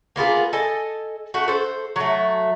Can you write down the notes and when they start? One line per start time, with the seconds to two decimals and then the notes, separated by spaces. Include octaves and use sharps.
0.16 A#3 B3 F4 G#4
0.53 A4 D#5 G#5
1.34 A3 F#4
1.48 A4 C5
1.96 F#3 A3